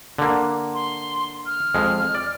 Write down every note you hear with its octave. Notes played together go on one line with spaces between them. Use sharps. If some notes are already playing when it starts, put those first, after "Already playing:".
D3 A#3
C6
F6
F2 G#3
D5